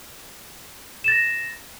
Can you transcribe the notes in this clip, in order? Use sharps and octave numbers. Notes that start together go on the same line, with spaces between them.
A6 A#6 E7